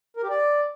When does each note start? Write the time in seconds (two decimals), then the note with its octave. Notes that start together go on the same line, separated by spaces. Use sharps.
0.17 A#4
0.23 G4
0.30 D5